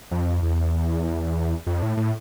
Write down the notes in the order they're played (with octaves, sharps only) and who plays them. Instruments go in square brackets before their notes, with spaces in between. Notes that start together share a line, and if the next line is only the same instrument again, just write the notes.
[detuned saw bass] F2
E2
F2
A2
A2